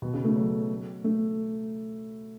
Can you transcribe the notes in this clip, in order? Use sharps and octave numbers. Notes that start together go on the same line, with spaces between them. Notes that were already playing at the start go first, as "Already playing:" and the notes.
B2
C#3
A3
F#3
A3